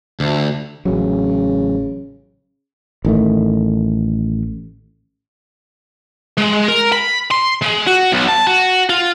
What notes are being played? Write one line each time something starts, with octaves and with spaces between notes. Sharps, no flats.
D2
A1 C#3 F#3
A1 D#3 A3
G#3
A#4
B5
C6
G#3
F#4
B1
A5
F#4
F4